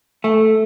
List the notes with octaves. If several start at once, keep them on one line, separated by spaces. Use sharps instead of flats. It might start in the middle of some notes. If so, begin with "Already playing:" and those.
A3